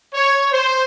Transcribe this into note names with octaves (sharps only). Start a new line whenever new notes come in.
C#5
C5